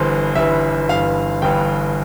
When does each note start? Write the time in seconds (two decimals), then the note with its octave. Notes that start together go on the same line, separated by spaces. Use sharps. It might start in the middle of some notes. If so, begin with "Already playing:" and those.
Already playing: G1 G2 E3 C5
0.35 G1 G2 E3 E5
0.89 G1 G2 E3 F5
1.42 G1 G2 E3 G5